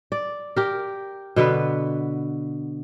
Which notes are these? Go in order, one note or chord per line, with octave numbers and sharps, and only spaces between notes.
D5
G4 A#4
B2 D3 B3 B4